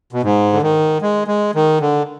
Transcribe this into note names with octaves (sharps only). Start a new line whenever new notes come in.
B2
G#2
D3
D#3
G#3
G#3
D#3
D3